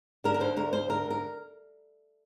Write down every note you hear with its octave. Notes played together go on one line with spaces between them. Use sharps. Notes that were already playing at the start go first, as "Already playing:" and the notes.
D3 A#4
A#4
D2 C5
D2 A#4
D2 C5
D3 A#4
D2 A#4